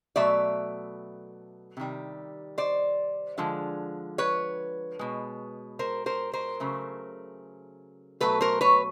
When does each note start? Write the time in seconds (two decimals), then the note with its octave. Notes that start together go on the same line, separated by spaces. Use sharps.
0.16 B2 F#3 A3 D5 E5
1.77 C3 D#3 G3
2.58 C5 D5
3.38 D3 F3 G#3
4.18 B4 C#5
4.99 B2 G#3
5.79 A#4 C5
6.06 A#4 C5
6.33 A#4 C5
6.60 C#3 F#3 A3
8.20 B2 F#3 A3 A4 B4
8.41 A#4 C5
8.61 B4 C#5